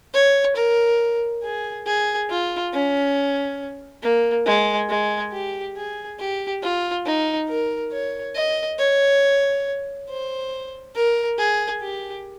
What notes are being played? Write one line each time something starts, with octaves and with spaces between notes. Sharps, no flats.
C#5
A#4
G#4
G#4
F4
C#4
A#3
G#3
G#3
G4
G#4
G4
F4
D#4
A#4
C#5
D#5
C#5
C5
A#4
G#4
G4